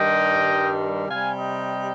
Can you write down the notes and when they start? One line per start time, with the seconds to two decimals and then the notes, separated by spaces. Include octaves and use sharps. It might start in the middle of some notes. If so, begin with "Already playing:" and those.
Already playing: G2 D#3 G3 D#5 G5
1.08 C3 G3 F5 G#5
1.39 D#5 G5